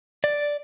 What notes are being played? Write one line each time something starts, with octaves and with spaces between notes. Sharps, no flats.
D5